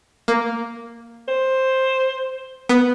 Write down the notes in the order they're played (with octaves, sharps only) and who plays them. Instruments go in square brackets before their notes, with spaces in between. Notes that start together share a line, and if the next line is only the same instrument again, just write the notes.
[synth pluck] A#3
[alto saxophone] C5
[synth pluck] B3